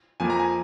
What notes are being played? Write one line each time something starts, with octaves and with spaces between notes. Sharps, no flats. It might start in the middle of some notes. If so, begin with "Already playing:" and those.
F2 F3 A#3 G#5
A#5
G#5